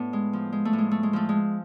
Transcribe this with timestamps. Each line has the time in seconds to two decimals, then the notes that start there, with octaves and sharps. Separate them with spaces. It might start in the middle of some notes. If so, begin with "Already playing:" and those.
Already playing: A2 B3 D4
0.13 G#3
0.33 F3
0.52 G#3
0.65 A3
0.73 A2
0.78 G#3
0.91 A3
1.03 G#3
1.13 F3 A3
1.29 G#3